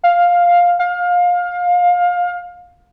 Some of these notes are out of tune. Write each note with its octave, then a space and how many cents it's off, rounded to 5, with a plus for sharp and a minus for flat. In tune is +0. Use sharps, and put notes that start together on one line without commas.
F5 +5
F5 +25